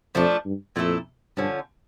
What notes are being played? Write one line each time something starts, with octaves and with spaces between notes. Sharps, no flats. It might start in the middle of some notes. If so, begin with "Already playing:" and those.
F2 F3 A3 D4
G2
F2 A#2 A3 E4 A4
G2 D3 F3 C#4